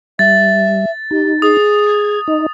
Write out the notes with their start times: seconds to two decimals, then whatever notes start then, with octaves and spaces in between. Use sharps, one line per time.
0.19 G3 E5 A6
1.11 D#4 G4
1.42 G#4 D#6
1.87 G#6
2.28 D#4 D#5